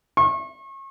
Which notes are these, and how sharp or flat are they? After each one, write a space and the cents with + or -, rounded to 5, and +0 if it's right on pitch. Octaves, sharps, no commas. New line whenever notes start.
C#6 -35